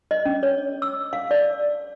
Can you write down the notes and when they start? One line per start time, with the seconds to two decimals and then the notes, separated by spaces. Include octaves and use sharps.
0.11 D#5
0.26 C#4
0.43 C#5
0.82 E6
1.13 F5
1.31 D5